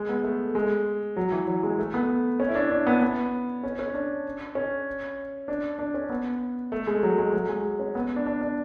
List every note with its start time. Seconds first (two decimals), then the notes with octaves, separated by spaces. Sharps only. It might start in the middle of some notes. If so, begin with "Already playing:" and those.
Already playing: G#3
0.09 B3
0.24 A3
0.55 G#3
1.16 F#3
1.32 E3
1.48 F#3
1.63 G#3
1.79 A3
1.94 B3
2.40 C#4
2.49 E4
2.55 D4
2.71 D4
2.87 B3
3.02 B3
3.63 C#4
3.79 C#4
3.94 D4
4.55 C#4
5.48 D4
5.79 D4
5.94 C#4
6.10 B3
6.72 A3
6.87 G#3
7.03 F#3
7.18 G#3
7.33 F#3
7.49 G#3
7.79 C#4
7.95 B3
8.16 D4
8.26 D4
8.41 D4